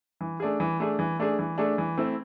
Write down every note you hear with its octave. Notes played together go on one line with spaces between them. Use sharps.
E3
A3 D4 G#4
E3
A3 D4 G#4
E3
A3 D4 G#4
E3
A3 D4 G#4
E3
A3 C4 E4